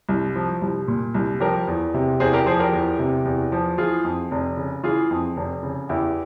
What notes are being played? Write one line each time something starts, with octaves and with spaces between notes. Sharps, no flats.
C2
F3
C2
A#2
C2
F3 G4 A#4
E2
C3
E2 G#4 C5
G4 A#4
F3 G#4 C5
G4 A#4
E2
C3
E2
F3
E3 F4 G#4
F2
F1
C#3
E3 F4 G#4
F2
F1
C#3
E2 E4 G4